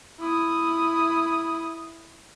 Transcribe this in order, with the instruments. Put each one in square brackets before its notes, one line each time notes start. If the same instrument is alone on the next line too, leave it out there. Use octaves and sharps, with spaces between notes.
[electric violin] E4 D#6